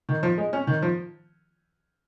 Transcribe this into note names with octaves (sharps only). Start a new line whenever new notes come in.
D#3
F3
G#3
C#4
D#3
F3